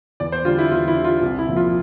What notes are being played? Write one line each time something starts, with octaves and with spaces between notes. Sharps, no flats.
E2 D5
C5
D3 G3 F4
E4
E2 F4
E4
D3 G3
F4
C2
E4
A#2 F3
F4